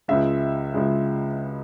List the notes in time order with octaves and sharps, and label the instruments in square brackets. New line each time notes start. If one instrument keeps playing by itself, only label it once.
[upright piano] C#2 C#3 G#3 E5
C#2 C#3 G#3